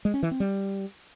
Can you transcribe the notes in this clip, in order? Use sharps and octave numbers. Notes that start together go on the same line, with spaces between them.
G#3
C#4
E3
C4
G3